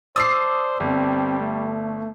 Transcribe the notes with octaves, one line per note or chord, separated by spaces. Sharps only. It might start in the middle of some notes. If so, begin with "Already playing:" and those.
D4 C5 D5 D#6 E6 C7
G1 G3 C4
A3